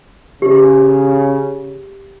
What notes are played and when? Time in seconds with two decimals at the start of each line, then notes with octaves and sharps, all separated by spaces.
0.42 C#3 G4